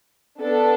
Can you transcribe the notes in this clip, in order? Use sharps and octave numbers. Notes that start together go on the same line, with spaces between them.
B3 D4 A4